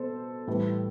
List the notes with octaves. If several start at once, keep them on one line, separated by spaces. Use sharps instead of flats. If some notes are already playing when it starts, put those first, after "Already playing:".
Already playing: B2 A4 C5
A2 E3 G3